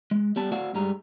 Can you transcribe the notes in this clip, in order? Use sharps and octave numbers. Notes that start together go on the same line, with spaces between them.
G#3
G3 B3 D5 A5
A3 F#4 D5 F5 F#5
G2 G3 G#3 A#5